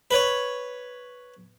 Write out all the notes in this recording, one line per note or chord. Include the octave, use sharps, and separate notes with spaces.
B4 C#5